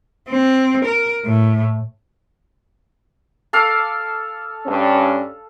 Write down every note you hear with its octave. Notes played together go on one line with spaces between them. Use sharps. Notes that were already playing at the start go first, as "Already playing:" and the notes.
C4
A#4
A2
A4 F5 D6
G2 C#4